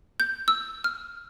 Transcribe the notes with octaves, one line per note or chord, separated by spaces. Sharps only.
G6
E6
F6